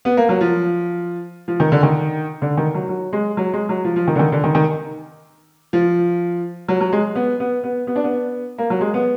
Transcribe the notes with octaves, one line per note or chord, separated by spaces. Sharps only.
B3
A#3
F#3
F3
F3
D#3
D3
D#3
D3
D#3
F#3
F#3
G#3
F#3
G#3
F#3
F3
F3
D#3
D3
D#3
D3
D#3
D#3
F3
F#3
F#3
G#3
B3
B3
B3
B3
D4
B3
A#3
F#3
G#3
B3